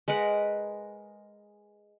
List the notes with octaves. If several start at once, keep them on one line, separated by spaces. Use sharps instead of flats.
G#3 A#4 B4 F#5